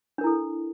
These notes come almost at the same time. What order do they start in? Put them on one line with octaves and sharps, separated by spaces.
D4 A#4 E4 A4